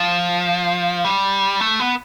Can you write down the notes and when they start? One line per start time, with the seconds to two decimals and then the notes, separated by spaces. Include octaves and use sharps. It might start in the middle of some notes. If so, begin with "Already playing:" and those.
Already playing: F3
1.04 G3
1.60 A3
1.80 B3